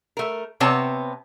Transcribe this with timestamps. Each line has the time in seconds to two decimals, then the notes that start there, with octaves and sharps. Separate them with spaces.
0.17 A3 A#4
0.60 C3 B3 C4 C#5 A5